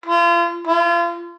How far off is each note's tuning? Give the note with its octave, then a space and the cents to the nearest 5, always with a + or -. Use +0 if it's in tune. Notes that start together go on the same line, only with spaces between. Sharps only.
F4 -35
F4 -35